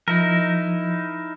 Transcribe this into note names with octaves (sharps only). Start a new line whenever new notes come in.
F3 D#4 E4 A#4